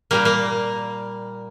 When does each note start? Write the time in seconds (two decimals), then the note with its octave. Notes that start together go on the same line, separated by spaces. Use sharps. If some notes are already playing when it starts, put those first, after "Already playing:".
0.11 A#2 G3 A#3
0.25 A#3